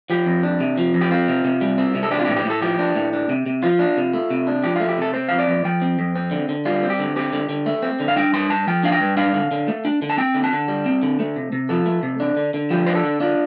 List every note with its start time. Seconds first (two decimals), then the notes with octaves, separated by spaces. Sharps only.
0.10 F3 G4
0.26 F2
0.43 D4
0.60 C3
0.78 F3
0.94 F2
1.01 G4
1.11 C4 F4
1.28 C3
1.45 C3
1.61 G3
1.78 C4
1.95 C3
2.03 A4
2.11 D4 G4
2.19 F4
2.25 G4
2.28 A2
2.36 G4
2.45 A2 A4
2.62 F3 G4
2.79 D4
2.95 A2
3.13 D4
3.29 C3
3.46 C3
3.63 F3 F4
3.79 D4
3.97 C3
4.13 A3
4.31 C3
4.47 D4
4.64 F3 G4
4.76 A3 F4
4.89 G4
4.98 C3 A4
5.14 C4 C5
5.29 F2 F5
5.39 D5
5.48 F2
5.65 F3 G5
5.82 C4
5.99 F2
6.16 C4
6.31 D3
6.49 D3
6.65 G3 F4
6.83 C4
6.90 G4
6.99 D3
7.16 C4 G4
7.33 D3
7.49 D3
7.66 A3
7.82 C4
8.00 D3
8.08 F5
8.16 D4 G5
8.34 G2 C6
8.50 G2 A5
8.67 F3 G5
8.83 D4 F5
8.92 G5
9.01 G2
9.17 D4 F5
9.34 D3
9.51 D3
9.68 A3
9.85 D4
10.02 D3
10.10 A5
10.18 C4 G5
10.34 D3
10.44 A5
10.52 D3
10.68 G3
10.86 C4
11.03 D3
11.20 A3
11.36 C3
11.52 C3
11.69 F3 A4
11.86 A3
12.03 C3
12.20 D4
12.37 D3
12.54 D3
12.70 F3 G4
12.86 D4 C5
12.95 A4
13.04 D3
13.20 D4 F4